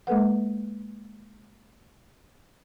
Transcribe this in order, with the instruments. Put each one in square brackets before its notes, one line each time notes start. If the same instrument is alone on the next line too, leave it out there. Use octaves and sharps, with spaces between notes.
[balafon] G#3 A#3 A4 B4 F#5